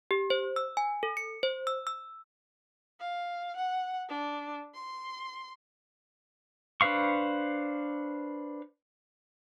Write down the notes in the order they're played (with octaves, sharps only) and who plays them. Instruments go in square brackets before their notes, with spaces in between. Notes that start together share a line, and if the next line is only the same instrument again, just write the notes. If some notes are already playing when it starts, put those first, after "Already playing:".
[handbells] G4
C5
E6
G#5
A4
C#7
C5
E6
E6
[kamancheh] F5
F#5
D4
C6
[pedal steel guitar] D4 B4 C5 F5 C#6